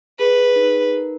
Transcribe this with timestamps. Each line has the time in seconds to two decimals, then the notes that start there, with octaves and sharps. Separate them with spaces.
0.19 G#4 B4
0.56 D#4
0.92 A#4